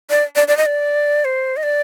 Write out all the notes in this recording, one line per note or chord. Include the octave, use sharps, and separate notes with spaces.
D5
D5
D5
D#5
D5
C5
D#5
D5